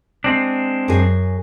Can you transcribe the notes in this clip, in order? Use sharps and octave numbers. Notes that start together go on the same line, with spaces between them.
G#3 C4 D4
F#2 G#4